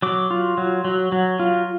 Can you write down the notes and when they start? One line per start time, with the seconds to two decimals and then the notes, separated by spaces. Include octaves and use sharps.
0.02 F#3 D6
0.31 F4
0.58 F#3
0.85 F#3
1.12 F#3
1.40 F4